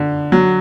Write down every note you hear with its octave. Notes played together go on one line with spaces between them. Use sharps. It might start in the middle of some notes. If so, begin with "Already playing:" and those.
Already playing: D3
F#3